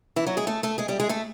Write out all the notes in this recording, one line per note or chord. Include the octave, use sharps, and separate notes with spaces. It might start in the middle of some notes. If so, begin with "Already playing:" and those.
E3 E4
F#3 F#4
G#3 G#4
A3 A4
A3 A4
G#3 G#4
G3 G4
G#3 G#4
A3 A4